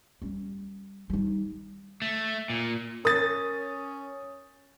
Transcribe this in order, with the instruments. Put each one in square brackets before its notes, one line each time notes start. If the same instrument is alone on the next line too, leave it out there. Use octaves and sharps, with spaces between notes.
[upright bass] G3 C#4
G3 D#4
[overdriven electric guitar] A3
A#2
[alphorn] C#4 [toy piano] A#4 [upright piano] D#6 A6